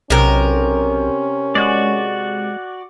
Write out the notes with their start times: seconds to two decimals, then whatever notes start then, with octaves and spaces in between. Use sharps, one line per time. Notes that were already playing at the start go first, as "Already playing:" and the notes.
0.10 B1 C3 C#4 A#4
1.55 G#3 F#4 D5